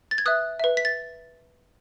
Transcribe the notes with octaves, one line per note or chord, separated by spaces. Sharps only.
A6
G#6
B4 E5 D#6 F#6
B4 E5
B6
A6